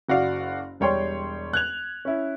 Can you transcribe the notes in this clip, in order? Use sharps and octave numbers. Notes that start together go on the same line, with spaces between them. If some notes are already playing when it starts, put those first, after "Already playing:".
F#1 F#4 D5 F5
E1 G3 C#5 G5 C6
F#6 G#6 F7
C#4 E4